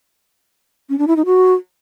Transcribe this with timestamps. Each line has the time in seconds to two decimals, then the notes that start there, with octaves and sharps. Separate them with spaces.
0.89 C#4
0.98 D4
1.07 E4
1.16 D#4
1.26 F#4